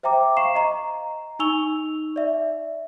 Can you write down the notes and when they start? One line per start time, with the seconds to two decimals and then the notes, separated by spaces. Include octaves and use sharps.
0.03 C5 E5 G5 A#5 D6
0.37 F5 C#6 C7 E7
0.55 D#5 A#5
1.39 D#4 G#5 C#6 E6 F7 G7
2.16 D5 E5